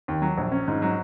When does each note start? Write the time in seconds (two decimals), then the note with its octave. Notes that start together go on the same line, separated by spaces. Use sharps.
0.08 D#2
0.22 F#3
0.38 A#1
0.52 C#4
0.68 G#2
0.82 F#3